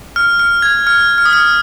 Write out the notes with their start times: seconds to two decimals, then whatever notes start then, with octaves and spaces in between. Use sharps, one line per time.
0.16 F6
0.39 F6
0.62 G#6
0.87 F6
1.18 F6
1.25 D#6
1.33 F6